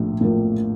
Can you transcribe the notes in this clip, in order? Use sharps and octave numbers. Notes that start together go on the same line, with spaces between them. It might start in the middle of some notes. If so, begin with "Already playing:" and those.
Already playing: A#1 A2 A#3
A2 F3 A#3